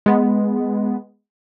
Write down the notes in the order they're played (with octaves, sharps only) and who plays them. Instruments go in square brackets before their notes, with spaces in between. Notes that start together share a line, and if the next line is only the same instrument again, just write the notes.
[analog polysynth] G#3 B3